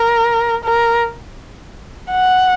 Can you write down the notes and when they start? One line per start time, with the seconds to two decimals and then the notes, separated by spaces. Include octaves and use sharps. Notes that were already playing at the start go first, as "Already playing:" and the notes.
Already playing: A#4
0.64 A#4
2.12 F#5